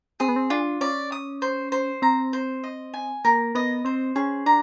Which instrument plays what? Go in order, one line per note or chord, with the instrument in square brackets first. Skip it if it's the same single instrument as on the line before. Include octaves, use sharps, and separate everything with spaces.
[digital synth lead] C4 [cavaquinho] G#4
[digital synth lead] B3
C4
[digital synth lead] D4 [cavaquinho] F4
[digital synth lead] C#4 [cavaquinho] D5
[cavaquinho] D#6
C5
C5
[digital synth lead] C4 [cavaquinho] A#5
[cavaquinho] C5
D#5
G#5
[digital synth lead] A#3 [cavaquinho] A#4
[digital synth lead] B3 [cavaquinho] D#5
[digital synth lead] C4 [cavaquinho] C5
[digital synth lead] C#4 [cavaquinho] G#4
[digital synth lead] D4 [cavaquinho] A#5